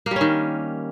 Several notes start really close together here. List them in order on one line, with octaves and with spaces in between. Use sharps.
A#3 G3 C#4 D#3